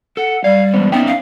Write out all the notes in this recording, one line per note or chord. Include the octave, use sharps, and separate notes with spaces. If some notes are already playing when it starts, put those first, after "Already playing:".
A4 F#5
G3 D5 F5
E3 G#3 B3 C5
B3 C#4 D#4 E5 G5
F5